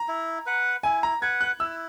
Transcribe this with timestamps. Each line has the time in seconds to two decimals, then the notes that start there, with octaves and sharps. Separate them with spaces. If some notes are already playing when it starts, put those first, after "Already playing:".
Already playing: A#5
0.08 E4
0.46 B4 F#5
0.83 E4 G#5
1.03 A#5
1.21 B4 F#5 G#6
1.41 F#6
1.59 E4 E6